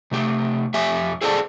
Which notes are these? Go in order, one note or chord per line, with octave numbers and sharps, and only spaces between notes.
C3 A3 G4
F2 G4 E5 G#5
G#4 A4 C5 D5 F5 A5